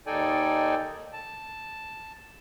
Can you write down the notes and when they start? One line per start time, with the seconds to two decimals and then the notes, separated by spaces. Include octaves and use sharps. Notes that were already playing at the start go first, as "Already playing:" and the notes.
0.07 D#2 D#4 A4 D5 G5 G#5
1.13 A5